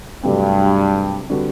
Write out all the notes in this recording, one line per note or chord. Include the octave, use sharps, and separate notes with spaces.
G2 C3 F#3 A3 C4
D3 G3 C4 F#4 B4